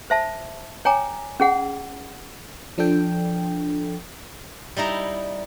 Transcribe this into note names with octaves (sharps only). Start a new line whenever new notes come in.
C5 E5 A5
C#5 G5 G#5 A#5 D6
C#4 G#4 F#5
F3 D4 A4 G5
G3 D#4 E4 A#5